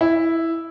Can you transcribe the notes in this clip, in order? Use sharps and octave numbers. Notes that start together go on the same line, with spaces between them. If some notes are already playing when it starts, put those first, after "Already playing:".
E4